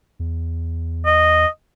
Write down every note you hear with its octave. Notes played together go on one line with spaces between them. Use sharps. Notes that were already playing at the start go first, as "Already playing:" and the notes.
E2
D#5